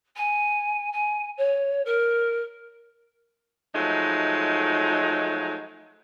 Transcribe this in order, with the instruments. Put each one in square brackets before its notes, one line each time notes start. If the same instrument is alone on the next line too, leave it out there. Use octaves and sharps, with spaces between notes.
[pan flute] G#5
G#5
C#5
A#4
[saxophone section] F3 F#3 G#3 A3 D#4